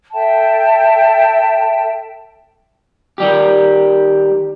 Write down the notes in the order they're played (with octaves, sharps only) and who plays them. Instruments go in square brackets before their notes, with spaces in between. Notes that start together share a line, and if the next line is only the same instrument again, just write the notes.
[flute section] A4 E5 G5 A5
[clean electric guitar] D#3 G3 G4